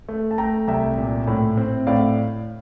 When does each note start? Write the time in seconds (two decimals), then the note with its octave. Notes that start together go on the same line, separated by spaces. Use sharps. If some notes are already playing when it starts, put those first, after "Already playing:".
0.09 A3
0.31 A5
0.38 A3 G5 A#5
0.68 C2 E5 G5
0.98 A#2
1.27 A2
1.57 C4
1.87 A2 D5 F5